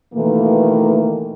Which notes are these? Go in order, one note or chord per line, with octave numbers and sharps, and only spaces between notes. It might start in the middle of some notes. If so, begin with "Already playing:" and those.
B2 D#3 E3 A3 A#3